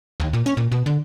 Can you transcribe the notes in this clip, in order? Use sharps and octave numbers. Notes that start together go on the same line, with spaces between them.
D#2
A#2
C#4
A#2
B2
D3